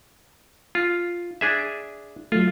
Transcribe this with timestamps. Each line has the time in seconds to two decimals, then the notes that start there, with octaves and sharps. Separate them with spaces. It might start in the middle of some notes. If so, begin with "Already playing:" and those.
0.75 F4
1.41 D4 G#4 E5
2.32 F#3 A3 F4